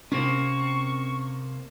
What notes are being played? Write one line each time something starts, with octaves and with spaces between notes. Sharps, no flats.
C3 A#3 C4 C#4 C#6